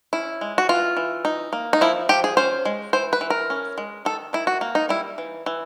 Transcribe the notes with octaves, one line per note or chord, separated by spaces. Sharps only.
C#4 E4
G#3
F#4
E3 F4
E3
D#4
A#3
D#4
F3 E4
F3 G4
G#4
C#4 C5
G#3
E3 C5
B4
E3
A#4
C#4
G#3
D#3 A4
D#3 E4
F#4
A#3
D#4
G3 E4
E3
E3